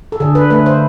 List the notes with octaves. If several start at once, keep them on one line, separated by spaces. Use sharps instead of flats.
A4
D3 G#4
B4
A3 B4
C5